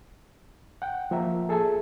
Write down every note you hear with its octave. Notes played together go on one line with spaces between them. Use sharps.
F#5 G5
F3 A#3 E5 A#5
G#4 A4 E5 G#5 A5